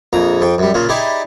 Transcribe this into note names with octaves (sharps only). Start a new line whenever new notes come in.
A#1 F2 A#5
F2 G5
F#2 G3
A#2 C#3 F4
D#4 E4 G4 G#4 D5